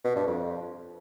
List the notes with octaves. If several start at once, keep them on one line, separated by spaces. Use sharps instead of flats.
B2
G2
F2